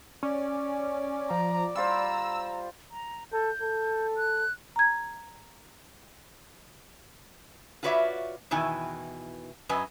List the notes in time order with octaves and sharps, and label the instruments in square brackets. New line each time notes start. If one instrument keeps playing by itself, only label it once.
[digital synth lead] C#4 [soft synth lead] D5
[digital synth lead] F3 [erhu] A#5
[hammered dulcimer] G3 F4 C5 [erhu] A#5 [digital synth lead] E6
[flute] A#5
[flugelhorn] A4 [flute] G6
[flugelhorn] A4
[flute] F#6
[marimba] A#5 G#6
[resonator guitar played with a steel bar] F4 F#4 B4 C#5 D5 E5
E2 B2 D#3 E3 G#5
F#2 F#3 B4 D#5 G#5